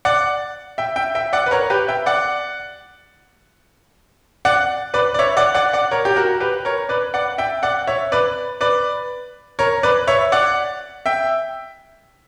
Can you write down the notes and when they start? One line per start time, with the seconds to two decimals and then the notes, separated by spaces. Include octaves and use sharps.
0.05 D5 F#5
0.78 E5 G5
0.96 E5 G5
1.15 E5 G5
1.33 D5 F#5
1.46 B4
1.51 A#4 C#5
1.70 G4 B4
1.88 E5 G5
2.06 D5 F#5
4.45 D5 F#5
4.94 B4 D5
5.14 D5
5.19 C#5 E5
5.37 D5 F#5
5.55 D5 F#5
5.73 D5 F#5
5.91 A#4 C#5
6.05 G4
6.16 F#4 A#4
6.40 G4 B4
6.65 A#4 C#5
6.89 B4 D5
7.14 D5 F#5
7.38 E5 G5
7.63 D5 F#5
7.87 C#5 E5
8.12 B4 D5
8.61 B4 D5
9.59 A#4 C#5
9.83 B4 D5
10.07 C#5 E5
10.32 D5 F#5
11.06 E5 G5